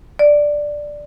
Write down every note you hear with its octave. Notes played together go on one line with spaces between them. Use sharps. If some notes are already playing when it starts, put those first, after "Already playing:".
D5